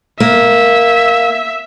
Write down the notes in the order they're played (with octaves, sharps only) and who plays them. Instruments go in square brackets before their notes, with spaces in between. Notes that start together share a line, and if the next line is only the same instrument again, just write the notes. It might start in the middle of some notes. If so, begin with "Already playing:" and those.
[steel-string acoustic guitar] A#3 [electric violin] E5